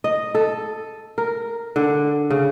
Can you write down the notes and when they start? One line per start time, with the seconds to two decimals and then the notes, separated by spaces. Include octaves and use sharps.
0.04 D#5
0.35 A4
1.18 A#4
1.76 D3
2.31 C#3